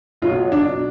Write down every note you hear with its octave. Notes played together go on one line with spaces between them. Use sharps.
B1 B2 F#3 F4
D4